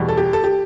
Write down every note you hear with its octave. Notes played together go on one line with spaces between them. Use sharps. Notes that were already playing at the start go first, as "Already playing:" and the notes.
Already playing: E2 B2 G3
A4
G4
A4
G4